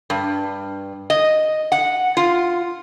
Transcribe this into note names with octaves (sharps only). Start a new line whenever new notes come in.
G2
D#5
F#5
F4